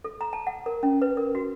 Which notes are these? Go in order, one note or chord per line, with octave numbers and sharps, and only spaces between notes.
A4
A#5
A5
F#5
A#4
C#4
B4
A#4
F#4